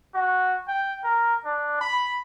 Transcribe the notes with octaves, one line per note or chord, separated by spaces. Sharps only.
F#4
G5
A#4
D4
B5